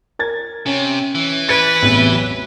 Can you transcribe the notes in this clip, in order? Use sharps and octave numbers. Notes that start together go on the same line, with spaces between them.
A#4 G#6 A6
C3 C#4
E3
B4 G#6 A6 C#7
A1 E2 C3
F#3